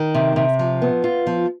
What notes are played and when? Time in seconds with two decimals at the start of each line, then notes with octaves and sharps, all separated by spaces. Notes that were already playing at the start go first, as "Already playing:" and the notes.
Already playing: D#3
0.15 C3
0.36 C3
0.59 F3
0.82 B3
1.04 F4
1.27 F3